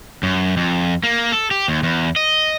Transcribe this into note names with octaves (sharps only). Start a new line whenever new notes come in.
F#2
F2
A#3
A4
G4
D#2
E2
D#5